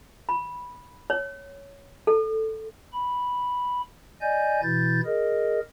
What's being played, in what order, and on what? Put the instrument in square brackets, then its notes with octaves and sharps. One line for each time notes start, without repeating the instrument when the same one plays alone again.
[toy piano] B5
C#5
A4
[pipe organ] B5
D5 D#5 G#5 G6
B2 E3 E4 G6 A6
G#4 A#4 D#5